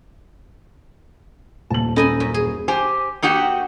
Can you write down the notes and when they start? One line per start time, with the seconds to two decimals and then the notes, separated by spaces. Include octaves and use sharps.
1.70 D#1 A5 F#7
1.96 C#4 D#4 A4 D#5 G#5 B5
2.20 F#2
2.34 G#4
2.68 G4 C5 G#5
3.22 A#3 D#4 F#4 G4